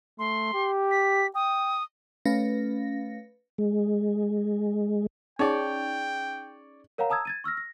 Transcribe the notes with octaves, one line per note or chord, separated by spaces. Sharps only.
A3 C6
G4
B6
G5 D#6
A3 C#4 B4 F5 A#6
G#3
C#4 D#4 G#4 C#5 D5 G5
A#4 C#5 F5 F#5 A#5
A5 A#5 D#6 E6 G#6
G#6 A6 D#7
C#6 E6 F6 A#6
A#6